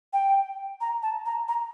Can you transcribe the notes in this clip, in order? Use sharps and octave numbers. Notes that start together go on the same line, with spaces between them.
G5
A#5
A5
A#5
A#5